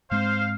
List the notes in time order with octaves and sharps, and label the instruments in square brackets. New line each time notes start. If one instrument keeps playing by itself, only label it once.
[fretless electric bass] G#2 G#3 C4 [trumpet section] C5 F5